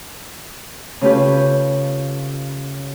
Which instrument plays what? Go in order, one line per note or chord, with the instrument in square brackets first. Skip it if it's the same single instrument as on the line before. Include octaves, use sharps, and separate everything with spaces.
[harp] C#3 A3 C#4 F4 G4 B4